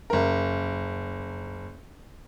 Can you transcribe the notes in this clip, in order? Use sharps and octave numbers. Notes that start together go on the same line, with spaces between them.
F#1 A#4